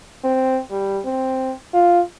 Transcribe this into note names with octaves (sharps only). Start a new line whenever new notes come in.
C4
G3
C4
F4